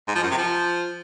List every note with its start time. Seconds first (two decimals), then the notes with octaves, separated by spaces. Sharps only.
0.08 G#2
0.15 F3
0.23 F#2
0.30 C3
0.38 F3